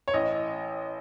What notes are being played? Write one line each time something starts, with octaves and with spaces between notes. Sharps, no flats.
C#5
A1 D#5